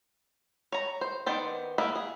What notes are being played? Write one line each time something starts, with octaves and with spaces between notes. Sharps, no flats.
C#5 A#5
C5
D#3 B3 C5 D5
A#3 B3 E4
G#4